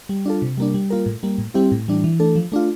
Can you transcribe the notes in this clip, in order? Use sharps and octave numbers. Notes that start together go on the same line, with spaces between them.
G3
D4 F4 A4
C3
G3 A#3 D4
G3
A#3 F4 A#4
A2
G3 A#3
A2
G3 C4 E4 G4
A2
E3 G3 D4
E3
A3 D4 A4
F3
A3 D4 F4